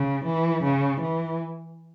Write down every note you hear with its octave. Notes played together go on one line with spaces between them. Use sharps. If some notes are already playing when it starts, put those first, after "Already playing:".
Already playing: C#3
E3
C#3
E3